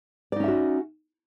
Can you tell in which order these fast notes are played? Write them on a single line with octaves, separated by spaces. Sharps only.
D5 D#4 C#4 E5 F#4